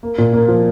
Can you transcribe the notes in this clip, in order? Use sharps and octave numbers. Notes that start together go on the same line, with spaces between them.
A#3
A#2
A#3
F3